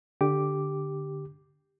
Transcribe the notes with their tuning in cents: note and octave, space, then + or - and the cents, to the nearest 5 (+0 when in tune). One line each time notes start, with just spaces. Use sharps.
D3 +0 G4 +0 D6 +0